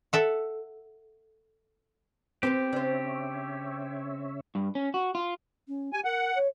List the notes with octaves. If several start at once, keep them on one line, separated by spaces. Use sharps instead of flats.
A4 E5 F#5
B3 C4 G4 B4 C5
C#3 D4 C5 C#5 E5
G2
C#4
F#4
F4
C#4
G4 G#5
A#4 F#5
C#5